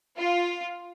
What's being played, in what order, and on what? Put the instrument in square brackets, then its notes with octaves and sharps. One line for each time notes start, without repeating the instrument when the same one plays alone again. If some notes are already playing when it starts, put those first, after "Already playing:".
[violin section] F4